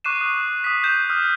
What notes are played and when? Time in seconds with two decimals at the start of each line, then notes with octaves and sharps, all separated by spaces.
0.04 C#6 D6 F#6 C7 D#7 E7
0.21 D#6
0.64 D#6 B6
0.84 G6 E7
1.10 D#6 F6